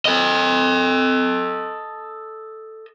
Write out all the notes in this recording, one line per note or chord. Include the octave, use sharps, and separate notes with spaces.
A4 D#5